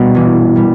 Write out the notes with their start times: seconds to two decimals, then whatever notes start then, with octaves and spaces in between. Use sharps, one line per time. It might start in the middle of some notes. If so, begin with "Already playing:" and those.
Already playing: A#1 B2 G3 D4
0.15 G1 G2 E3
0.56 A#2 G3